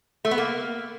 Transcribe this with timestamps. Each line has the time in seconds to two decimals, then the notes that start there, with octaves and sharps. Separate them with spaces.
0.25 A3
0.31 B3
0.38 A#3